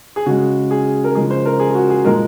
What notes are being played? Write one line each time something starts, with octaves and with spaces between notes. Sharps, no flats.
G#4
C#3 G#3 F#4
G#4
A#4
C#3 F3 G#3 G#4
C5
A#4
G#4
G#4
F#4
G#4
A#2 F3 G#3 A#4